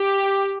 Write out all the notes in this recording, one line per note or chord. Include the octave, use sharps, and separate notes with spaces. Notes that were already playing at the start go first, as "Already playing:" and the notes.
Already playing: G4